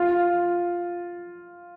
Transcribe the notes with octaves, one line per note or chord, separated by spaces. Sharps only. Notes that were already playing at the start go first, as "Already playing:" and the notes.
Already playing: F4